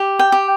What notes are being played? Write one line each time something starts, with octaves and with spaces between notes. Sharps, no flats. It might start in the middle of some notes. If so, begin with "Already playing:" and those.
Already playing: G4
G5
G4